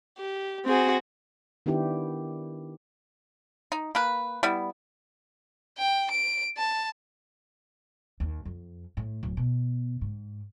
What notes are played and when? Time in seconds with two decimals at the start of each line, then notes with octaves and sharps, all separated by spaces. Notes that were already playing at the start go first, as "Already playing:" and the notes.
0.17 G4
0.66 C4 F#4 G#4
1.66 D#3 B3 D4 E4 G4
3.72 D#4
3.95 A#3 B4
4.43 G3 B3 E4
5.78 G5
6.11 D7
6.57 A5
8.20 D#2
8.45 F2
8.97 A2
9.23 D1
9.37 B2
10.01 G#2